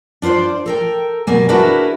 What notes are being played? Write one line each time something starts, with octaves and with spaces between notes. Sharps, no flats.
D4 F4 B4 C5 D5
A4 A#4 G5
B2 F#3 G3 A#3 G#5
D4 E4 F#4 G#4 A#4 B4